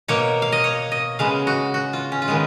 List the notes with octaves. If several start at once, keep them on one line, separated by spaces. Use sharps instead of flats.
B2 A#3 C#5
F5
D#5
C#5
D#5
C#3 G#3 B3 F5
F#4
F#4
F4
C#4
F4
D#3 G#3 B3